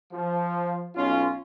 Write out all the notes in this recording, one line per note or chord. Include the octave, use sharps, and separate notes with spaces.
F3
B1 C#4 F4